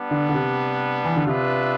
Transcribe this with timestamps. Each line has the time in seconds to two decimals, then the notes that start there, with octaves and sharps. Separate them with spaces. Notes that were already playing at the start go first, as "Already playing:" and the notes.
Already playing: G3 B3 D4
0.11 D3
0.29 D3
0.34 C3
1.05 E3
1.16 D3
1.26 C3 B3 D4 F4 B4 E5